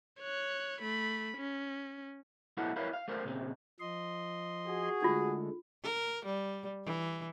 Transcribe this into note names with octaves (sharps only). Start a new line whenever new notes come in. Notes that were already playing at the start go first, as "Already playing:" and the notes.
C#5 F#6
A3 B5
C#4
B1 A2 B3 E4 A4 F#5
E4 A#4 B4 C#5 F5
F5
A3 A#4 C5 F5
A#2 C#3 C4
F3 D#5 C6
F#4 G#4
D3 G#3 A3 D#4 F4
A#4
G3
E3